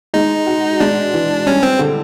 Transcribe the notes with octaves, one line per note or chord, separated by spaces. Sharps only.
G#3 D#4
F#4
G#3 D4
E3
G3 C#4
C4
D3